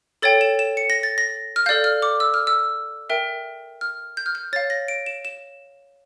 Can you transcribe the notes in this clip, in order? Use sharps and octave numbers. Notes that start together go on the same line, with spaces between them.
A4 C#5 G5 A6
E7
E7
C#7
A#6
A6
A#6
F6
A4 D5 F5 G6
F6
D6
E6
F6
E6
A#4 E5 G5
F6
G6
F6
G6
C#5 F5 A6
A#6
D7
E7
E7